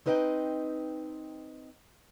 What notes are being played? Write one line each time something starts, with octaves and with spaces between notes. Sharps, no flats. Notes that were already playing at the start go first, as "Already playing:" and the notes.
C4 D#4 B4 D#5 E5 G5